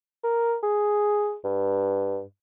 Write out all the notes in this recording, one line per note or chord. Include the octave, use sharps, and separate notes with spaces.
A#4
G#4
G2